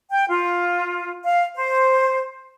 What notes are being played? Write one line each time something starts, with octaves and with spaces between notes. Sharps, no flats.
G5
F4
F5
C5